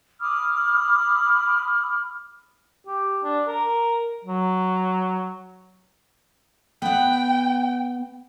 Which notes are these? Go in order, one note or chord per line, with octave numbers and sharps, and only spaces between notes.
B5 D6 D#6 F6
G4
D4
A#4
F#3
B3 F#5 G5